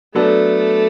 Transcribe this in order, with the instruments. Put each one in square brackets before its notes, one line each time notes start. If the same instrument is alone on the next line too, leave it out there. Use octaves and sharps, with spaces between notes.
[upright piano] F#3 B3 D4 A4 [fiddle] A3